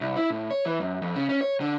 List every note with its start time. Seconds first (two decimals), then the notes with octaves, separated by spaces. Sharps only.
0.01 C2
0.16 E4
0.30 A2
0.51 C#5
0.66 E3
0.80 F#2
1.02 F2
1.16 C#3
1.29 C#4
1.41 C#5
1.61 D3